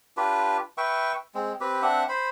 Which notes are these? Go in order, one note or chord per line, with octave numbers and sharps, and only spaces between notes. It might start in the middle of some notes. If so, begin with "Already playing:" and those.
D4 F4 G4 B4
B4 E5 G5 C#6
G#3 C4
C4 G4 B4
C4 D4 E5 F#5
C5 B5